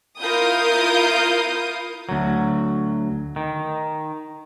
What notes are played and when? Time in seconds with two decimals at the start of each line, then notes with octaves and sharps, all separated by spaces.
0.21 E4 F4 A#4 F5 D#6 G6
2.09 D2 F#3
3.36 D#3